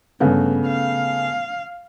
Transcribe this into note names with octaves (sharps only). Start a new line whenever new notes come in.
G2 C#3 A3 B3
F5